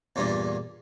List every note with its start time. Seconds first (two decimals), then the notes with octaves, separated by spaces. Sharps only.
0.16 E2 G2 A#2